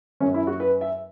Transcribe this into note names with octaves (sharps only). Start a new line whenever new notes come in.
F#2 F#3 C#4
E4
F#4
B4
E5